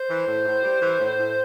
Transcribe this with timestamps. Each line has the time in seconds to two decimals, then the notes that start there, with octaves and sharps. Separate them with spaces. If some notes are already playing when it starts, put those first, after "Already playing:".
Already playing: C5
0.09 E3
0.27 A2
0.45 A2
0.63 G3
0.81 E3
0.99 A2
1.17 A2